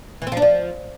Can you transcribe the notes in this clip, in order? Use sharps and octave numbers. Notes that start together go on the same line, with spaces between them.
E3
C4
F3
D4
F3